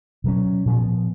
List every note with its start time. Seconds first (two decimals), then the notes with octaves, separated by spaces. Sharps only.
0.24 B2 F#3 C#4
0.65 A#2 F3 B3